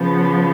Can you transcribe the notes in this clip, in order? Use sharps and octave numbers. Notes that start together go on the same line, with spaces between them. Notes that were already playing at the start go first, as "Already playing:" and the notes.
Already playing: C#3 F3 B3